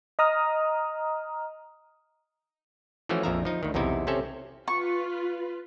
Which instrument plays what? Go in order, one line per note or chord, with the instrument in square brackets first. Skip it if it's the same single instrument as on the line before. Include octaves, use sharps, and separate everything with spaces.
[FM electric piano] D#5 A#5 D#6 F6
[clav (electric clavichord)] E3 F3 A3 C#4 F#4
A#1 F2 F3 E5 F5 A#5
F3 D#4
D2 D#3
B1 E2 C3 D#4 E4
C3 C4 C#4 A4 E5
[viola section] F4 B4 [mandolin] C#6